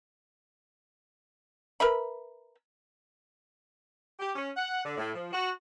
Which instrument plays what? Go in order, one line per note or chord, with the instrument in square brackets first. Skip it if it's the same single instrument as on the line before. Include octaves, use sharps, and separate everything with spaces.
[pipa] A#4 B4 E5 B5
[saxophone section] G4
C#4
F#5
D3
A2
F3
F#4